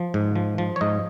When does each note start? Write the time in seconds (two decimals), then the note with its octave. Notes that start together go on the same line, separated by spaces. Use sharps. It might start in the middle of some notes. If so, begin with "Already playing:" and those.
Already playing: F3
0.14 G#2
0.36 F3
0.58 F3
0.76 C#5
0.81 G#2 D#5